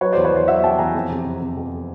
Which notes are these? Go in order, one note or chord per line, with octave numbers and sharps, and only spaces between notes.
F#3 B4 C#5
E2 C5 D5
B4 C#5
E2 C5 D5
F#3 E5 F#5
F#3 G5 A5
E2 G#5 A#5
F2
C3
C3
C3
F2